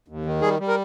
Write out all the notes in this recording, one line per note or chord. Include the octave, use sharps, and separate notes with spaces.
D#2
D#3
G3 G#4
G3
A#4